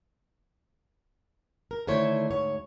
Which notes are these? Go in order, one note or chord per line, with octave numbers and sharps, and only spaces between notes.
A#4
D3 D#3 A3 E4 C5 C#5
D2 G#2 C#5